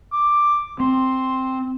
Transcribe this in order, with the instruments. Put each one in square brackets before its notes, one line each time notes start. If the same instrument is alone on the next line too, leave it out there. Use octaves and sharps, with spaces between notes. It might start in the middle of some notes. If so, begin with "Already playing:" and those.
[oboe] D6
[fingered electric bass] C4 [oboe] C6